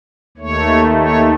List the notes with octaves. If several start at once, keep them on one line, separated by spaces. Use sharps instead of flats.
D#2 D#3 A3 C#5
C#5